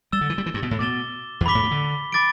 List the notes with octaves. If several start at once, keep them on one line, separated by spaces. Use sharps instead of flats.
G3 E6 A6 E7 G7
D3
E3
G3
E3
G2
B2
A2
B2 D6 A6 E7 G7
E2
G2 B5 D6 B6 G7
A2
B2
D3
B5 D6 A6 D7